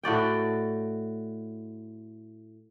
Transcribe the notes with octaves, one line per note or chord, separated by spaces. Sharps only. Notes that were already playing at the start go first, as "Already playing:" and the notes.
A2 F#4 D5 G5